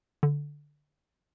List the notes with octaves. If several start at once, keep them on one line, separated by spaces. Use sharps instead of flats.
D3